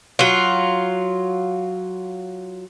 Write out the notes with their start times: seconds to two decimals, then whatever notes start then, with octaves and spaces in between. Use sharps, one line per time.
0.19 F#3 F4